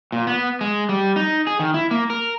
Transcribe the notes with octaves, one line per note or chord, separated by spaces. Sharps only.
A#2
B3
G#3
G3
D#4
G#4
D#3
E4
A#3
A#4